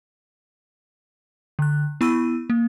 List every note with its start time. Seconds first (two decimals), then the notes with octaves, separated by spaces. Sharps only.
1.59 D3 F#6
2.01 B3 E4 B5 C#6 E6 D#7
2.50 A#3